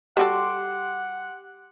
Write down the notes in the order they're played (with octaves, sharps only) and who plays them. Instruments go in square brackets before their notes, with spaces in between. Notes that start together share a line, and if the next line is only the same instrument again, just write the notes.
[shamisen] G3 F#4 A4 [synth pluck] G4 C6 D6 [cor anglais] F#5